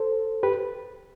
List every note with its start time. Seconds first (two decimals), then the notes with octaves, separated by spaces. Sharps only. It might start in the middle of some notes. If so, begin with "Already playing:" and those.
Already playing: A4 C5
0.43 G4 B4